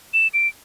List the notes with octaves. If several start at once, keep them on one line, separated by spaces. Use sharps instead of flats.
E7
D7